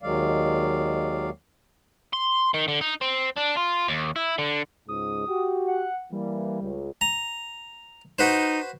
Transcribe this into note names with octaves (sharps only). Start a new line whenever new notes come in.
D#2 D#3 F#3 G#3 D5 F5
C6
D#3
D3
D#4
C4
D4
F4
D#2
E4
D3
C#2 G#2 D#6
F#4 G4
F#5
E3 G3 A#3
C#2
A#5
D#4 F#4 B4 C5